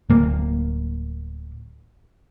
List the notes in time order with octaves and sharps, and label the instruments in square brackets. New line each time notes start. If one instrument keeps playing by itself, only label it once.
[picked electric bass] D1 A#3